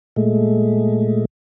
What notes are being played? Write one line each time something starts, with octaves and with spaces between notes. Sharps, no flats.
A#2 G#3 A3